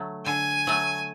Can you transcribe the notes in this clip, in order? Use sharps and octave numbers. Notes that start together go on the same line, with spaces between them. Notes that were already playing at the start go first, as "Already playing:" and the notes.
Already playing: D3 F#3 A3
D3 G#5
F#3 A3